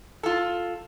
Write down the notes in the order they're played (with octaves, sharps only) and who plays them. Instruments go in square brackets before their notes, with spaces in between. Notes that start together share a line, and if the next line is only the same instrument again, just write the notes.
[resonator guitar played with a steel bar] F4 A4